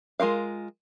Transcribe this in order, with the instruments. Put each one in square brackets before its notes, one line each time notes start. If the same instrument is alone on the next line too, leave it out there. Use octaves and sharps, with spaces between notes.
[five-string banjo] G#3 F4 A#4 F5